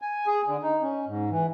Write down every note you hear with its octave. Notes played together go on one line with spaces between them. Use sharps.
G#5
G#4
D3
D#4
C#4
G#2
E3